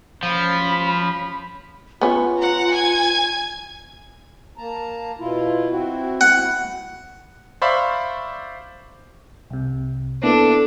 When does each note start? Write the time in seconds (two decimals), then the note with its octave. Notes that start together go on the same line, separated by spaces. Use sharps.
0.23 F3 C#4 B5
2.01 B3 C#4 F4
2.38 F#5 A#5
2.71 G#5 G#6
4.58 A#3 A5 A#5
5.19 B2 E4 F4
5.70 C4 E4 F#4
6.21 F#5
7.62 C5 D5 E5 F5 B5 C#6
9.50 C2 C3
10.23 A#3 B3 D4 E4 A4